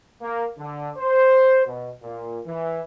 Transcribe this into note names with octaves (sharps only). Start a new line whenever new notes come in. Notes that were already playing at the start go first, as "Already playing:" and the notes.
A#3
D3
C5
B2
A#2
E3